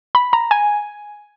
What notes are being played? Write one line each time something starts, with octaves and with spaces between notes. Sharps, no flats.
B5
A#5
G#5